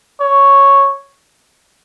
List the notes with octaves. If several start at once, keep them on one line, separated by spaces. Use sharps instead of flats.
C#5